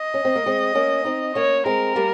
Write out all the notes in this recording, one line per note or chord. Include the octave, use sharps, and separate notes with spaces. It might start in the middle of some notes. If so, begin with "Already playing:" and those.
Already playing: D#5
C#4
C4
A#3
G#3 C4
A#3 C#4
C4 D#4
A#3 C#4 C#5
G#3 C4 A#4
G3 A#3